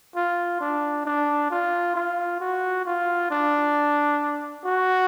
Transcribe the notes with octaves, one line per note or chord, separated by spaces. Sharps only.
F4
D4
D4
F4
F4
F#4
F4
D4
F#4